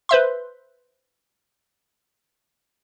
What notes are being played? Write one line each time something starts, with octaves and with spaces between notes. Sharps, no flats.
B4 C5 E5 C6